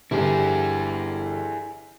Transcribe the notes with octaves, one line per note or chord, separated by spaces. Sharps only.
G1 E4 G4 G#4